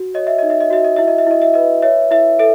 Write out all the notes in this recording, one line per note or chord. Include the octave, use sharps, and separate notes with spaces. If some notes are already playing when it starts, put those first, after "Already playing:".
Already playing: F#4
C#5 D#5
E5
D#4 D#5
E5
D#5
F#4 E5
D#5
E4 E5
D#5
E5
E4 D#5
E5
B4 D#5
C#5 E5
E4 E5
A4 E5